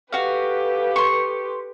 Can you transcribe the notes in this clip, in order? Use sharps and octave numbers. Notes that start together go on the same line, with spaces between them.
F#4 G4 A4 B4 F5
C6 C#6